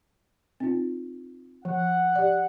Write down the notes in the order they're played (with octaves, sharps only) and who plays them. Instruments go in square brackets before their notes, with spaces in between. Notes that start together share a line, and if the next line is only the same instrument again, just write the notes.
[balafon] C4 D#4 F4
[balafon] F3 [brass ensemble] F#5
[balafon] G4 D5